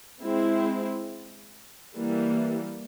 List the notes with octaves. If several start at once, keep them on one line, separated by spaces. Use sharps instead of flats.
G#3 C4 E4
E3 G3 A#3